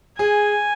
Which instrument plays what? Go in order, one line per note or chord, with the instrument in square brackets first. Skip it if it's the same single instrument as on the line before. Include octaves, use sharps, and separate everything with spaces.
[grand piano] G#4 [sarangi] G#5